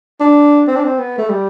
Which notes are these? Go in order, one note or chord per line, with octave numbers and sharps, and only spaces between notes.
D4
C4
D4
C4
B3
A3
G3